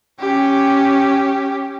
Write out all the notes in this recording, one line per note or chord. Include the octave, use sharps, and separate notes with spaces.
C#4 G4